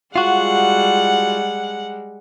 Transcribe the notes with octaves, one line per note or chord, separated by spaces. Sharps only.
G3 G#3 F4 F#4 F#5